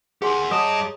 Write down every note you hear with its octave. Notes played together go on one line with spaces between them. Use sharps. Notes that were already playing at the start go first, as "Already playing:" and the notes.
G4 G#4 A#4 F#5 G#5 C6
G3 G#4 C#5 D#5 A5 A#5 D6 D#6